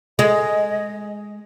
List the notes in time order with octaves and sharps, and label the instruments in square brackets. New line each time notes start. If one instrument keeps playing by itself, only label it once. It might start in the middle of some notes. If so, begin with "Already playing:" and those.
[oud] G#3 [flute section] D#5